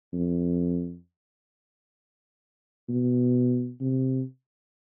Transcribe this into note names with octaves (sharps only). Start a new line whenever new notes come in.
F2
B2
C3